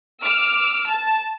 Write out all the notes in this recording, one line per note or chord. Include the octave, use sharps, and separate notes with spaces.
D6 E6 F6
A5